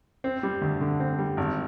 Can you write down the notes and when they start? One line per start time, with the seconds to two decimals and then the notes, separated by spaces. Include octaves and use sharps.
0.24 C4
0.43 G3
0.62 D2
0.81 D3
1.00 C4
1.19 G3
1.37 G#1